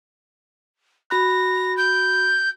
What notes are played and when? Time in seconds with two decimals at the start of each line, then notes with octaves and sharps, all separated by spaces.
1.10 F#4 B5 F#6 A#6
1.77 G6